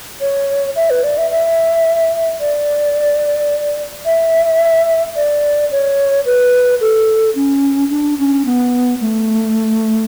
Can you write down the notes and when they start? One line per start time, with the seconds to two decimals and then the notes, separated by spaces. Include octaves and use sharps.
0.21 C#5
0.76 E5
0.90 B4
1.03 D5
1.18 E5
1.31 E5
2.40 D5
4.05 E5
5.16 D5
5.71 C#5
6.26 B4
6.81 A4
7.35 C#4
7.90 D4
8.18 C#4
8.45 B3
9.01 A3